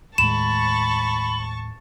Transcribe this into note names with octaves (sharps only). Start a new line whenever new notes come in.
D#2 A2 G#3 A5 B5 C#6 E7